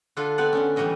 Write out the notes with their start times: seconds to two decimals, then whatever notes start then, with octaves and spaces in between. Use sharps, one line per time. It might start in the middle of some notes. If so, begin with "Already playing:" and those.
0.17 D3 D4 F4 A4 B4
0.38 B3 C4 B4 D5 F#5
0.53 D3 B3 C#4
0.76 A2 E3 G3 C#5 D#5 E5